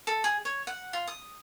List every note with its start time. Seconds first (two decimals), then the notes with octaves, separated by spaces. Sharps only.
0.07 A4
0.24 G#4
0.45 C#5
0.67 F#5
0.93 F4
1.07 D#6